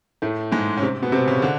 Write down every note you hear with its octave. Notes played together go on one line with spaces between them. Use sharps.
A2 A3
G#2 G#3
C#4
C3 C4
B2 B3
C3 C4
C#3 C#4
D3 D4